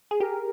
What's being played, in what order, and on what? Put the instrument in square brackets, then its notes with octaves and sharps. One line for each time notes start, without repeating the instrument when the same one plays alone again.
[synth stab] G#4
[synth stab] G4 [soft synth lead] A#4